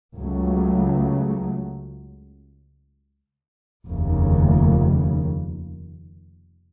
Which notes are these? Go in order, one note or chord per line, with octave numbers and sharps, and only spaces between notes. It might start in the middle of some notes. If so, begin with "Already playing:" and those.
C#2 C#3 F#3 A3
F1 D#2 C#3